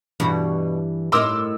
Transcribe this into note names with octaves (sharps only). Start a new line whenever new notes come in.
G2 B2 E3 F#4
A2 A#4 D#5 C6 D6 E6